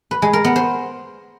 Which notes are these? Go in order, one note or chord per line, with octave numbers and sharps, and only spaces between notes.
B4
G#3
A#4
B3
C5